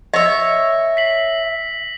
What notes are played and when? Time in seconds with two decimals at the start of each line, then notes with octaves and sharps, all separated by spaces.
0.14 C#5 D#5 E5 A#6
0.97 B6 C7 F#7